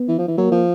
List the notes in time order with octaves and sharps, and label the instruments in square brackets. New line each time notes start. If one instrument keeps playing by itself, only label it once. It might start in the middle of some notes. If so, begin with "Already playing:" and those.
Already playing: [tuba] B3
[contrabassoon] E3
F3
E3
[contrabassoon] F#3 [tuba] A#3
[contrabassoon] F3